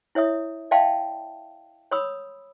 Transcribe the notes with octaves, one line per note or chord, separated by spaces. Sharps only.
E4 C#5 E5 D#6
D5 E5 F5 G5 A5 C6
C#5 B5 C6 D#6 E6